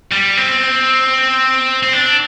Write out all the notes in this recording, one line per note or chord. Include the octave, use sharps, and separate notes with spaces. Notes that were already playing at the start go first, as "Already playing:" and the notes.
G3
C4
C4
D4